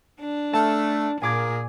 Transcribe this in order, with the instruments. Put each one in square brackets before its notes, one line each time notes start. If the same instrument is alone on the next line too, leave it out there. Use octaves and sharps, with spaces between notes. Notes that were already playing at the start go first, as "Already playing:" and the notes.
[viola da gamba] D4
[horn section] A3 [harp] A5 F6
[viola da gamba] A#2 [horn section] F4 G#4 A#4 [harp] G#5 D6 G#6